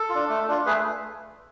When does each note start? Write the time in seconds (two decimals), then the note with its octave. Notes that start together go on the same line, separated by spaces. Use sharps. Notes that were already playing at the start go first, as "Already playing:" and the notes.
Already playing: A4
0.10 F4
0.15 D4
0.29 A3
0.48 D4 F4
0.66 A3 G#4 B4